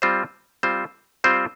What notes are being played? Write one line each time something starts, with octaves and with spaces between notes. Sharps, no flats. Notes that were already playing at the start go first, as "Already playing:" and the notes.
G3 C4 F4 C5
G3 C4 F4 C5
G3 C4 F4 C5